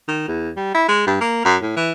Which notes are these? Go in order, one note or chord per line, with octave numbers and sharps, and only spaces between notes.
D#3
E2
G3
E4
G#3
G2
A#3
F#2
A2
E3